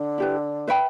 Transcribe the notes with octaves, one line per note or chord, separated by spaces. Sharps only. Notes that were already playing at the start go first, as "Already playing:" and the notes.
Already playing: D3
E4 G4 B4
B4 E5 G5 B5